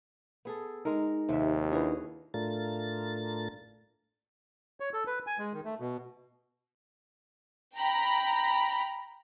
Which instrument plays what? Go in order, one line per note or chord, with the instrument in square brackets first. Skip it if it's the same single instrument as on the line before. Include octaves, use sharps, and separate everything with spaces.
[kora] B3 G#4 A4
[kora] G#3 A#4 [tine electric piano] D#4
[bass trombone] D#2 [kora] C3 E5
[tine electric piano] D4 E4 B4 [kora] F#4 G#4 C#5
[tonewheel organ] A2 A3 D4 F4 A#4 A6
[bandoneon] C#5
A4
B4
G#5
G#3
D#3
A3
B2
[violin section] G5 A#5 B5